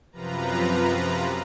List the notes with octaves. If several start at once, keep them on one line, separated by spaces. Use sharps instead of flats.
F#2 C3 F3 F4 B4 A#5